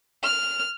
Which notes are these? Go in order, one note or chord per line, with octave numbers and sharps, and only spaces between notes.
F6